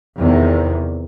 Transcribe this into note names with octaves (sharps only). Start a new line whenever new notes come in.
E2 C3 D#3